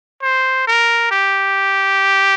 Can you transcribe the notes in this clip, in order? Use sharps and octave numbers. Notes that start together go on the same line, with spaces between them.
C5
A#4
G4